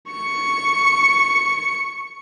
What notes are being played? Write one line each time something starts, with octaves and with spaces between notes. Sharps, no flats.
C#6 C#7